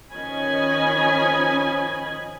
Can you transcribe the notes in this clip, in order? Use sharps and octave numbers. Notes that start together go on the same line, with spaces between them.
D#3 F3 C#4 D#5 G#5 B5